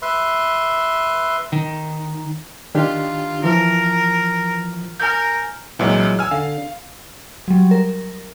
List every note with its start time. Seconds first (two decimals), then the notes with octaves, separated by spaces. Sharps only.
0.02 B4 E5 C6
1.52 D#3
2.75 D#3 D4 F4 G4
3.44 E3 F3 F4 A#4
5.00 A#4 G#5 G6
5.79 C2 A#2 E3 F#3 G#3
6.19 G#5 E6 F6
6.31 D3 F5
7.48 F#3 G3
7.71 A#4